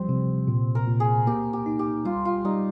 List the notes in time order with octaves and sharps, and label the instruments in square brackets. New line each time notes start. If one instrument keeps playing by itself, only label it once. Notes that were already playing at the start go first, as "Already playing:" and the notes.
Already playing: [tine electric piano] F3 G3 [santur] C4
[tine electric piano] C3
A#2
[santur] A#4
[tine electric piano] A#2
[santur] G#4
[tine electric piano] A#3 [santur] G4
[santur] G4
[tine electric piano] D#4
[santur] G4
[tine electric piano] G3 [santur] F4
[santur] F4
[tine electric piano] G3 [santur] D#4